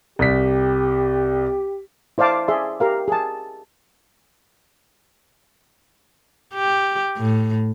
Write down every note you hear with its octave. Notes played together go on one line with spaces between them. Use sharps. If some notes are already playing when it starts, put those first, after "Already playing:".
C2 G4 B6
E4 C5 D5 F5 A5 D6
G#4 D5 E5 C6
G4 A#4 F5
G#4 A5
G4
A2